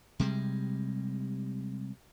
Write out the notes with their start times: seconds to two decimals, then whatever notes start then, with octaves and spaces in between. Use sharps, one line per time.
0.19 C3 G3 G#3